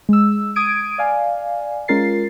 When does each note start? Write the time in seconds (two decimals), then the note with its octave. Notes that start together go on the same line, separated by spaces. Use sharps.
0.09 G#3 E6
0.56 D#6 G#6 D7 D#7
0.98 D5 F5 G#5
1.88 G#3 C#4 F4 A#4 A6 C7